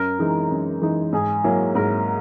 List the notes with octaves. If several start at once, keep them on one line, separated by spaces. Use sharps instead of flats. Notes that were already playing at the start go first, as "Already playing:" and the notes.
Already playing: F#2 A#4
E3 G#3 D#4
F#2
E3 G#3 D#4
G#2 G#4
F#3 A#3 E4
G#2 A#4